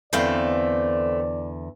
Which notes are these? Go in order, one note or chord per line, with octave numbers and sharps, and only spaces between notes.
E2 D3 E3 A3 C4 D5 F5